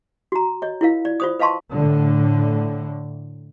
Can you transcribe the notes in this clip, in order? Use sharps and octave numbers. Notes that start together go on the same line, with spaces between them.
F#4 A#5
C#5 D#5
E4 F4 A#4 F5
D5
F4 C5 D#6
B4 D#5 F5 A5 C6 C#6
A2 D3